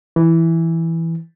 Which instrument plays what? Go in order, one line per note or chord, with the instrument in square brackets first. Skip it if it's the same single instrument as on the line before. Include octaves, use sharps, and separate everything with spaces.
[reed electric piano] E3